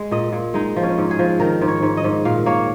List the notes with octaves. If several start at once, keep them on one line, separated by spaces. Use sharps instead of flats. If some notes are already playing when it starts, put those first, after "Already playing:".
Already playing: G#3
A#2 D#5
A#2
G#3 D#4
F3
C#4
G#2
G#4
F3
D#3 A#4
G#2
C#5
G#2
D#5
G#2
A#2 F5
A#3 C#5